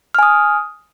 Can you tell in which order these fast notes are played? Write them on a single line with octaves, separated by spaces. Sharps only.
F6 G#5 D#6